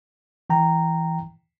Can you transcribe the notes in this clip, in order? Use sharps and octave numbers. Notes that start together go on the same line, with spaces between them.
E3 G5 A#5